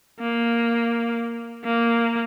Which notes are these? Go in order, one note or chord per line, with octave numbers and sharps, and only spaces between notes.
A#3
A#3